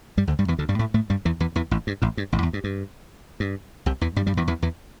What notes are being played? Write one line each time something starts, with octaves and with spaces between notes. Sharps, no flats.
G2 G3
D2 D3
G2 G3
E2 E3
D2 D3
G2 G3
A2 A3
A2 A3
G2 G3
E2 E3
E2 E3
E2 E3
A1 A2
G2
A1 A2
G2
A1 A2
E2
G2
G2
G2
C2 C3
E2 E3
G2 G3
G2 G3
E2 E3
E2 E3
E2 E3